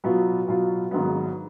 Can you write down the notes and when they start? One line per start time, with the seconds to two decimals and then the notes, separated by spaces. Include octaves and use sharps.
0.04 B2 F#3 B3 F4
0.48 B2 F#3 B3 F4
0.91 G#1 G#2 F#3 B3